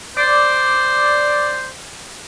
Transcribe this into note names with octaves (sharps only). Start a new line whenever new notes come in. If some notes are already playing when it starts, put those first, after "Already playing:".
C5 D5